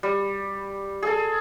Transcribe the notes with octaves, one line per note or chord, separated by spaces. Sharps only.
G3
G#4 A4